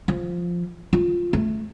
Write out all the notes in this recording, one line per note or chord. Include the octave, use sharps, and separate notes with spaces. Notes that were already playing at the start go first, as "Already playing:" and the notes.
F3
F4
A3